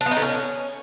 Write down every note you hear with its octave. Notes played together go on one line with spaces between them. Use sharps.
D4
B3
D#4
D3
C#4